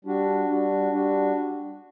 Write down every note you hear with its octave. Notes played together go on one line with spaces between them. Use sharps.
G3 D4 F#4
G3 D4 F#4
G3 D4 F#4